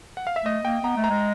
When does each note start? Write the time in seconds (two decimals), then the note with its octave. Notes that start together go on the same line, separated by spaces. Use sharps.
0.17 F#5
0.27 F5
0.36 E5
0.45 A3 D#5
0.64 A#3 G5
0.83 B3 A#5
0.97 A3
1.04 A#5
1.10 G#3